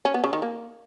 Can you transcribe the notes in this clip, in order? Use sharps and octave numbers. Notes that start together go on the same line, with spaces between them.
C#4
B3
C#3
D#3
A#3